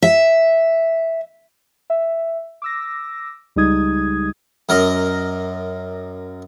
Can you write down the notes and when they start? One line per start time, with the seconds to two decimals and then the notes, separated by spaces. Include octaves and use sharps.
0.02 E5
1.90 E5
2.62 D6 E6 A#6
3.56 C#2 G3 G#3 D#4 D#6 G#6
4.69 F#2 A#4 D#5